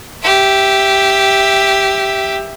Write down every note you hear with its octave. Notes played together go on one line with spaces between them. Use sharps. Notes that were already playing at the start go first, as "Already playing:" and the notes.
G4 E5